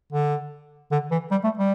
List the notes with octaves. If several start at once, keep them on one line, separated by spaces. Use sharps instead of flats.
D3
D3
E3
G3
A3
G3